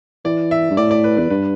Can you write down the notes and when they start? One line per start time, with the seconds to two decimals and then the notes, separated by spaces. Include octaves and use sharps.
0.25 E3 D5
0.51 E5
0.71 G2
0.77 A2 D5
0.91 D5
1.04 B4
1.17 E2 B4
1.30 G2 B4